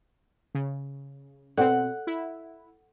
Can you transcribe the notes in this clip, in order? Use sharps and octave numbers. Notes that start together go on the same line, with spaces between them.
C#3
B2 C4 A4 D5 F#5
E4